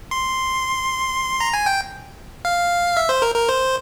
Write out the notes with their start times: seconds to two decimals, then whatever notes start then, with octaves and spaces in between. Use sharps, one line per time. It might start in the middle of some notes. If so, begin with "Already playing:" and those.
0.11 C6
1.40 A#5
1.54 G#5
1.66 G5
2.45 F5
2.97 E5
3.09 C5
3.22 A#4
3.35 A#4
3.49 C5